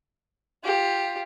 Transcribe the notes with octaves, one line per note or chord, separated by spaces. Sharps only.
F4 G4